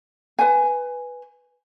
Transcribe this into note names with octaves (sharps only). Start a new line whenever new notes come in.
B4 G#5